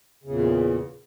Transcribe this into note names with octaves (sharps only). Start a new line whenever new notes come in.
E2 A#2 C#3